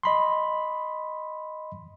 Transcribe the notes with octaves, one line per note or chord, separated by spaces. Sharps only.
D#5 B5 C6